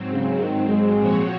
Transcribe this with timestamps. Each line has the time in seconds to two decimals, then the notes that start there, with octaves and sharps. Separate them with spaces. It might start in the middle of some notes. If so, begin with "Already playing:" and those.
Already playing: G#2 F#3 C4
0.12 C#3
0.40 D#3
0.69 G#3
0.97 A#2 F3 C4 F#4 C#5